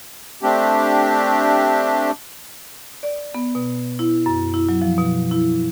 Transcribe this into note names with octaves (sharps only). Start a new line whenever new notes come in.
A3 C4 D4 G4
D5
B3
B2
E4
F#2
E4
F#3
F3
B2
E4